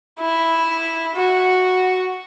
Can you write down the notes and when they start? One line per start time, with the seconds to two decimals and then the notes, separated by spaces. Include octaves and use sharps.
0.20 E4
1.15 F#4